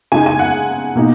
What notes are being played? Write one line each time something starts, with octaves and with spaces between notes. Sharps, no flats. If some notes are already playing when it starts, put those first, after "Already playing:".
C#3 G#3 D#4 G#5
G#5
F#5
B2 A#3 D#4